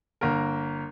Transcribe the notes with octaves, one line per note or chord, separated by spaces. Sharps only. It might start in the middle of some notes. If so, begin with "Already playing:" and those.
G1 A#3 A#4